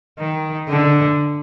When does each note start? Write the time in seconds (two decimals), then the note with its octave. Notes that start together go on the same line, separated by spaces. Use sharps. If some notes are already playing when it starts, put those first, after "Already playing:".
0.19 D#3
0.69 D3